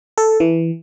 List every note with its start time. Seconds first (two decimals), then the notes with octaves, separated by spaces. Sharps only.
0.18 A4
0.40 E3